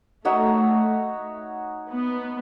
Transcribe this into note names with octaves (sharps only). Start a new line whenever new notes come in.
A3 D#4 F#4 C#5 E5
B3